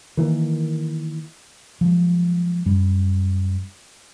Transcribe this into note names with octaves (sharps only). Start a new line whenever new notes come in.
D#3 E3 A#3
F3 F#3 G#3
F#2 G3